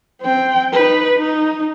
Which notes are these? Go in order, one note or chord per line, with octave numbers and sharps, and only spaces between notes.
C4 G5
D#4 B4
D#4